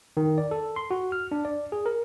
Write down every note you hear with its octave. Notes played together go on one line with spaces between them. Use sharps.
D#3
D5
A4
C6
F#4
F6
D4
D5
G#4
A#4